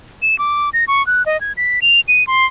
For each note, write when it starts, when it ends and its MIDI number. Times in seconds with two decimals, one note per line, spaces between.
0.22 0.38 100
0.39 0.70 86
0.74 0.85 94
0.88 1.05 85
1.07 1.25 90
1.26 1.39 75
1.41 1.53 92
1.57 1.80 95
1.82 2.00 101
2.08 2.26 99
2.27 2.46 84